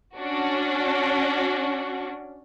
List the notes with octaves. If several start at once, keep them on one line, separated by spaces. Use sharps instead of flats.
C#4 D4 F#4